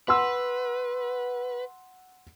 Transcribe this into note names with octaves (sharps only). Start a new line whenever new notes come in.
B4 F#5 C6 E6